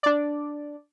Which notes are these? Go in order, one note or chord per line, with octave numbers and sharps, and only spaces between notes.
D4 D5